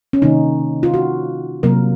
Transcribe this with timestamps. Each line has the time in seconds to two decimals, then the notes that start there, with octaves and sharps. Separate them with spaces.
0.13 C#4
0.22 C3 D#3 A#3 D#4
0.83 F4
0.94 F#4
1.63 C3 F#3 A#3 A#4